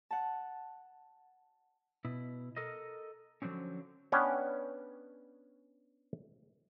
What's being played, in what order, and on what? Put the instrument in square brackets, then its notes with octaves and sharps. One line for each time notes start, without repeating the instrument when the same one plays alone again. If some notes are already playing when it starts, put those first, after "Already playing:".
[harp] F#5 A5
[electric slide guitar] B2 E4
A4 A#4 D#5
D3 F3 F#3 C4 C#4
[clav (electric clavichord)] B3 C#4 D4 B4 C#5 G5